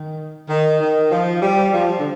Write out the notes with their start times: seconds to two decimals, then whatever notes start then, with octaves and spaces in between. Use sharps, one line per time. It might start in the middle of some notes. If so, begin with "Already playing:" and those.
Already playing: D#3
0.49 D#3
0.80 D#3
1.11 F3
1.42 G3
1.73 F3
1.99 D3